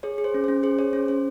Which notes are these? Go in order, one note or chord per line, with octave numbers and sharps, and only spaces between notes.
G#4 C#5
G#4
C5
C#4
C5
C#4
G#4 C5
G#4 C#5
C#4 C5
C#4 C5